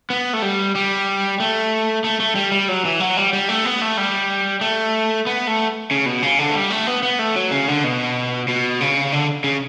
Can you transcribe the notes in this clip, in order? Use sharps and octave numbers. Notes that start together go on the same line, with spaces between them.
B3
A3
G3
G3
A3
A3
A3
G3
G3
F#3
E3
F#3
G3
G3
A3
B3
A3
G3
A3
B3
A3
C#3
B2
C#3
D3
A3
G3
A3
B3
B3
A3
F#3
C#3
D3
B2
B2
C#3
D3
C#3